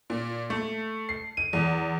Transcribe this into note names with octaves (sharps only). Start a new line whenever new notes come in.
A#2
A3
C7
D#7
E2